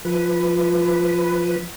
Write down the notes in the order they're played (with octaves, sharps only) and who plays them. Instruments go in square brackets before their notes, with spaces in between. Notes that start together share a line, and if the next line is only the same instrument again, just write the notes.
[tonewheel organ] F3 B4